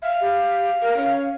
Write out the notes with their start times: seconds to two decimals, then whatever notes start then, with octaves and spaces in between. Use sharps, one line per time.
0.02 E5 F5
0.21 G4
0.82 A#4
0.97 C#4